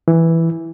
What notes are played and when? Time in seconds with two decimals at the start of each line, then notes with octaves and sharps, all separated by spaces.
0.08 E3